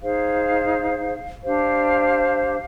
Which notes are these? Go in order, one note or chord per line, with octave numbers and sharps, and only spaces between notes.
D#4 G#4 C5 F5
D4 G4 C5 F5